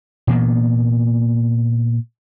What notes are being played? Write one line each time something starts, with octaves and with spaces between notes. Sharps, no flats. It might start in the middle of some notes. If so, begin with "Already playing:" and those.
A#2 E3 A#3 B3